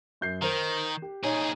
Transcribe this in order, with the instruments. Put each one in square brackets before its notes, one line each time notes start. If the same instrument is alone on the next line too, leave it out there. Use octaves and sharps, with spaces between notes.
[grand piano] F#2 G6 C7
[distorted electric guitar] D#3 [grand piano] A#4 C5
[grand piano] G4
[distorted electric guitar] A#2 G#4 [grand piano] D#4 C#5 D#5